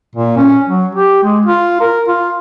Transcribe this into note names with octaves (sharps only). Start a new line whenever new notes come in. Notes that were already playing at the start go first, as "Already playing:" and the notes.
A#2
C#4
F#3
G4
G#3
F4
A#4
F4